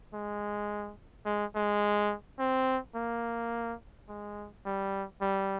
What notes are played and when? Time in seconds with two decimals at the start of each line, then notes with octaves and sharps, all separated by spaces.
0.14 G#3
1.26 G#3
1.55 G#3
2.39 C4
2.95 A#3
4.09 G#3
4.66 G3
5.22 G3